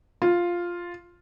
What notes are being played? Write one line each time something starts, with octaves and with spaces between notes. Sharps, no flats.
F4